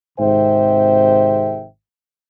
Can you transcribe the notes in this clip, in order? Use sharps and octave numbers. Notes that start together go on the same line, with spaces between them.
G#1 G#2 C3 C5 E5 G5